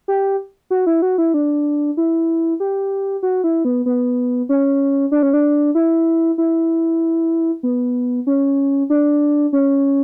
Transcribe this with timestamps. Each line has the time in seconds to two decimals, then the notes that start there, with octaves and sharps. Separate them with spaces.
0.08 G4
0.70 F#4
0.87 E4
1.02 F#4
1.18 E4
1.34 D4
1.97 E4
2.60 G4
3.23 F#4
3.44 E4
3.65 B3
3.86 B3
4.49 C#4
5.12 D4
5.23 C#4
5.33 D4
5.75 E4
6.38 E4
7.63 B3
8.27 C#4
8.90 D4
9.53 C#4